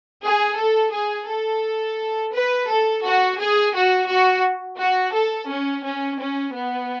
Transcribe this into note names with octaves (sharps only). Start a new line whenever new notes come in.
G#4
A4
G#4
A4
B4
A4
F#4
G#4
F#4
F#4
F#4
A4
C#4
C#4
C#4
B3